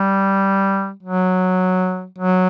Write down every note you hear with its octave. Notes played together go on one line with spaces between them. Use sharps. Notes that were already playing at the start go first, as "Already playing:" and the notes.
Already playing: G3
F#3
F#3